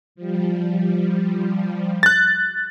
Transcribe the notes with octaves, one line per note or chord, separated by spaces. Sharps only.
F3 G3
F#6 A6